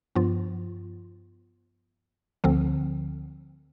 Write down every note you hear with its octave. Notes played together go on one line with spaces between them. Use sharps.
G2 F3 B3 F4
D2 D3 F3 C4